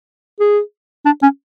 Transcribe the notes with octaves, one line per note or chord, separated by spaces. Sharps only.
G#4
D4
C#4